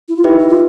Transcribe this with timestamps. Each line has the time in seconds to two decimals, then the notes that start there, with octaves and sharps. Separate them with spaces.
0.09 E4
0.16 F4
0.24 D#4 E4 G4 B4 E5
0.39 E4
0.49 F4